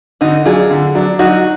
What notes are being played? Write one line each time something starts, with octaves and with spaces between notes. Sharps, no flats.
D3 D#4 F#4
F#3 D4 F4 G#4
D3
F#3 D4
F#3 D#4 F#4